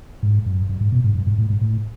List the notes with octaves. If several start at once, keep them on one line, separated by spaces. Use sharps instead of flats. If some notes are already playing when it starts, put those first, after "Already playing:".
G#2
F#2
F#2
G#2
B2
G#2
F#2
G#2
A2
G#2
A2